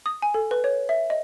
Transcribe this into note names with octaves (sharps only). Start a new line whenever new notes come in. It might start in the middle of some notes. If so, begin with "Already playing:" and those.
D#6
G#5
A4
B4
C#5
E5
D#5